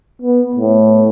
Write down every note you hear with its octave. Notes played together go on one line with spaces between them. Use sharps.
B3
A2